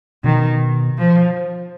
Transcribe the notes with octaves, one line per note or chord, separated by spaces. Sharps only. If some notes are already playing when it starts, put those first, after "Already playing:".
B2 D#3
F3